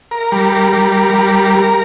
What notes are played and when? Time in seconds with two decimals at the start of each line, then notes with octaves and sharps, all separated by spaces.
0.11 A#4
0.32 G3
0.53 A#4
0.73 G3
0.94 A#4
1.14 G3
1.34 A#4
1.55 A#4